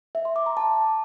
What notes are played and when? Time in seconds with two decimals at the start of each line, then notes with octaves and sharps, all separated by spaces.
0.15 E5
0.25 C6
0.36 D6
0.46 A#5
0.57 A5